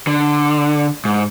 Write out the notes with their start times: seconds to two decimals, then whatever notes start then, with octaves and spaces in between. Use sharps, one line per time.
0.07 D3
1.05 G#2